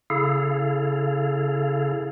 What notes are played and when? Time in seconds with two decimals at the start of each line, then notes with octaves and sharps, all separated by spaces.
0.10 C#3 E4 G#4 A4 F5